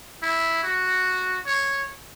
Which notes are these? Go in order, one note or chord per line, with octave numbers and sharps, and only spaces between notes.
E4
F#4
C#5